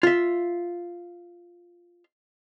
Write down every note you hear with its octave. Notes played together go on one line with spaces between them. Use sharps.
F4 E5